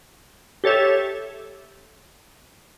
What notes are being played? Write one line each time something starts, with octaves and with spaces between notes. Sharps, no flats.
G4 A4 C#5 E5